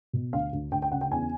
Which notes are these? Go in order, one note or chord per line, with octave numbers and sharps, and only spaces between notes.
B2
D2 F5
D2
D2 G5
G5
C#3 F#5
G5
E2 G#5